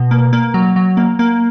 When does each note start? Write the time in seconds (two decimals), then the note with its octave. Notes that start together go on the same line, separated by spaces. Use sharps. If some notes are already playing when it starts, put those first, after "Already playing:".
Already playing: B2
0.11 A#3
0.33 A#3
0.54 F#3
0.76 F#3
0.97 A#3
1.19 A#3